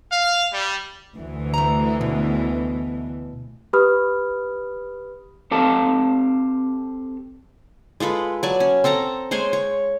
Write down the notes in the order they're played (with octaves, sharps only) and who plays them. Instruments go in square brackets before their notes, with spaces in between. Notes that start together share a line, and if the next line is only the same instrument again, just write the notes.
[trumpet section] F5
G3
[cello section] D2 E3
[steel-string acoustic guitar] A3 A#5
B2
[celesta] G4 B4 B5 D#6 F6
[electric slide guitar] C4 G4 A4 F5 A5
[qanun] G#3 F4 A4 B4
F#3 D5 G#5 A5
C#4
C4 A4 A5 A#5
G#3 C5 C#5 G#5
C#5